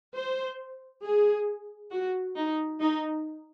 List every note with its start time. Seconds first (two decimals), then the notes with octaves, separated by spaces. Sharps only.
0.15 C5
1.04 G#4
1.91 F#4
2.37 D#4
2.81 D#4